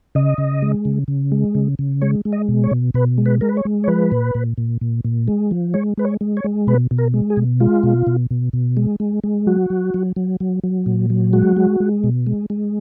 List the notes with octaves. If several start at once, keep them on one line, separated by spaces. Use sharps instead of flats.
C#3 D#5
C#3
G#3
C#3
C#3
G#3
C#3
C#3
G#3 C#5
G#3
D#5
B2
C#5
B2
B2 B4
G#3
B4
G#3 A#4
B4
C#5
G#3
C#5
F3 B4
A#2
A#2
A#2
A#2
A#2
G#3
F3
G#3 C#5
G#3 B4
C#5
G#3
C#5
G#3
B2 B4
B2
A#4
G#3
G#4
B2
G#3 F4
B2
B2
B2
B2
G#3
G#3
G#3
F#3 F#4
F#3
F#3
F#3
F#3
F#3
A#2
F#3
G#3 F#4
G#3
G#3
B2
G#3
G#3